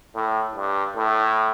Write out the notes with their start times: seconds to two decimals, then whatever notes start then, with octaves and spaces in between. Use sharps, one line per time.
0.15 A2
0.55 G2
0.96 A2